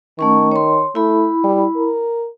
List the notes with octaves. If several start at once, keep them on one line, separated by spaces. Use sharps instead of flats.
D#3 A3 C#4 C#6
C#5 C6
A3 E4 B5
G3
A#4